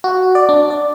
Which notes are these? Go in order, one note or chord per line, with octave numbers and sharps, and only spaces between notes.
F#4
D5
D4
D5